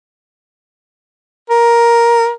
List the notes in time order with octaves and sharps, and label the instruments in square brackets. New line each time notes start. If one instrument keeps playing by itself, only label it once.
[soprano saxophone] A#4